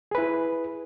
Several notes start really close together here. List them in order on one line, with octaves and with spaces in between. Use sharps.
G#4 B4 E4